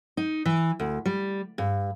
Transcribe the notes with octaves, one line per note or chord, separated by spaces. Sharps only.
D#4
E3
D2
G3
G2